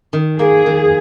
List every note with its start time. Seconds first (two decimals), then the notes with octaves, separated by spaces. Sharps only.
0.13 D#3
0.39 A#3 G#4
0.66 D#3